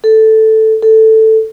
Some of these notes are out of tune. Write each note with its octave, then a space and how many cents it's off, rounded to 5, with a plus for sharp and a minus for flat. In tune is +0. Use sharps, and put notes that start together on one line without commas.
A4 +0
A4 +5